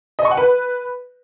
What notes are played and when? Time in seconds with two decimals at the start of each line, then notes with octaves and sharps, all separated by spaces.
0.19 D#5
0.25 C#6
0.31 F#5
0.37 B4